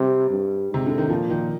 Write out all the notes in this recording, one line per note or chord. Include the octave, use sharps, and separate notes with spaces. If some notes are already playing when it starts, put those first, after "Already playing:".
Already playing: C3 G3
G2
G#2 C3
D3
D#3
A#2 F3
D#3